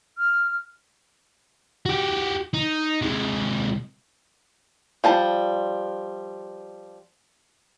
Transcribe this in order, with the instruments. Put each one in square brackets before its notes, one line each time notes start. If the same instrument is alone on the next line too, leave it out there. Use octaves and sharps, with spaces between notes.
[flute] F6
[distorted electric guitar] F#4 G4
D#4
C3 G#3
[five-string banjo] F3 G3 A5